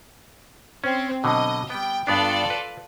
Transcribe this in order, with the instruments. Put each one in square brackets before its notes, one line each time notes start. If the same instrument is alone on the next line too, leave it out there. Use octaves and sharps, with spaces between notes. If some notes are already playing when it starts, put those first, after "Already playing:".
[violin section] C4 [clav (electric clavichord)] C#4
[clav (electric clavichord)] B2 D3 F#3 [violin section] D#5
[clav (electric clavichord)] G3 B3 [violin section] G5
[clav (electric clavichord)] G2 B3 D4 [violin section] F4 A4 D5
[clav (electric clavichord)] B4